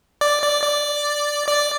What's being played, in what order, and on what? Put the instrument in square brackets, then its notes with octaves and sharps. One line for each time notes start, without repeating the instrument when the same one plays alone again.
[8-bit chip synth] D5
D5
D5
D5